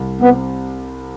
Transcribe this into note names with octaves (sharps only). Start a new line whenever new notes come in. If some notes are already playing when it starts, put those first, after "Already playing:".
Already playing: C2
C3 B3